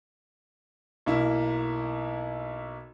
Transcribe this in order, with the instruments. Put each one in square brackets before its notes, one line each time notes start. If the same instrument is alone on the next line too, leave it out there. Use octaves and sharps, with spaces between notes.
[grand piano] B1 A#3 E4